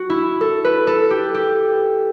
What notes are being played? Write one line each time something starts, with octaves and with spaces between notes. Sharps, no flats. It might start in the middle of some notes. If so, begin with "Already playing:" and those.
Already playing: F#4
E4
A4
B4
A4
G4
G4